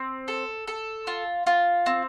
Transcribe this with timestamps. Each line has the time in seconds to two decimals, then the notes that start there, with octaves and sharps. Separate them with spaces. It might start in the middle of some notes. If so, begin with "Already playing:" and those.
Already playing: C4
0.28 A4
0.68 A4
1.07 F4
1.47 F4
1.86 C4